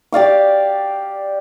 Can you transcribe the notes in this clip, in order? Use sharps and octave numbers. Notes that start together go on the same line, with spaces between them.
G4 D5 F5 D6